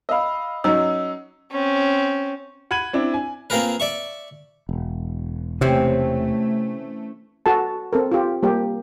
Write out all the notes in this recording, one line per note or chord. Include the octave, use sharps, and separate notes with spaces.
D#5 F5 B5 E6
F#3 C#4 D#4 D#5 E6
C4 C#4
F#5 B5 G#6 D#7 F#7
C4 D4 E4
G#5
A#3 C4 F4 G#4 A#4 B4
D5 E5 C#6
E1
C3 E3 A3 C4 C#4
F#4 A4 A5
C4 A4 A#4
F4 G4
G3 A#3 G4